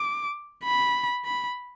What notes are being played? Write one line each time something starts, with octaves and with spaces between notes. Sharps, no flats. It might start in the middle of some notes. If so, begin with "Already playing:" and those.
Already playing: D6
B5
B5